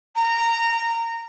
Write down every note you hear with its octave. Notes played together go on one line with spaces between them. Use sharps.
A#5